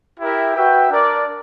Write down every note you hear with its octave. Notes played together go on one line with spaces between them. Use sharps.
E4 G4 A#4 E5 G5
F#4 B4 E5 G5
D4 A#4 D5